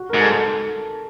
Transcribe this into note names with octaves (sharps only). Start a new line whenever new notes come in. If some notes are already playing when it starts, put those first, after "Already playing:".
Already playing: F#4
G#2 A#4
A4
A4